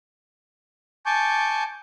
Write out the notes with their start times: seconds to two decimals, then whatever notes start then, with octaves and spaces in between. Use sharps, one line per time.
1.06 G#5 A5 C#6 D6 G6